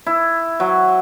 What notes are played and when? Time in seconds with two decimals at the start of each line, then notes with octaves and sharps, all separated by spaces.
0.06 E4
0.60 F#3